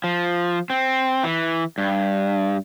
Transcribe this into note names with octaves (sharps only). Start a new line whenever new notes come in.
F3
C4
E3
G2